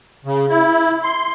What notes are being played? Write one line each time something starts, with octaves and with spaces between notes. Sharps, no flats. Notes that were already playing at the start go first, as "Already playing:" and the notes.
C#3
E4
C6